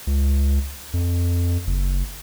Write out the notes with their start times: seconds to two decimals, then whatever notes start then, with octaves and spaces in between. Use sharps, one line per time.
0.07 C#2
0.93 F2
1.67 F#1